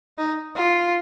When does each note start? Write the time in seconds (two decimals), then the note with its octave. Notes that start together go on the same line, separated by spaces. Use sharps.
0.18 D#4
0.56 F4